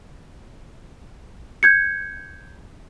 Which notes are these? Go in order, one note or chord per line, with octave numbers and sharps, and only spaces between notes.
G6 G#6 C#7